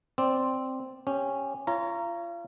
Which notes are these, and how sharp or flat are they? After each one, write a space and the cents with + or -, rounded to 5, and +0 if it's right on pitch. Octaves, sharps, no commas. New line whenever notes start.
C4 +0 D5 -5
C#4 -10 G4 +10
F4 -35 C#5 +15 A#5 +0